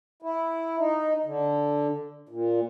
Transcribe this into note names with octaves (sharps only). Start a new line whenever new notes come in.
E4
D#4
D3
A#2